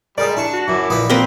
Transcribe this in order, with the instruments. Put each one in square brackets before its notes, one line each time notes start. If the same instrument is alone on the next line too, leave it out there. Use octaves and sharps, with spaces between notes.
[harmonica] G3 G#3 [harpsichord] G#4 A#4 [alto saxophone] D5
[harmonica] D4 [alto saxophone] E4 [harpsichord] C6 C#6
[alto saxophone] F#4
[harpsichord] F#2 [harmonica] E4 D6
[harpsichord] A#1 D#5 B5 [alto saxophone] E3
[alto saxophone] A#3 [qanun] C4 B4